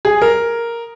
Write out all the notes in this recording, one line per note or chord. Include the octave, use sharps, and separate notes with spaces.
G#4
A#4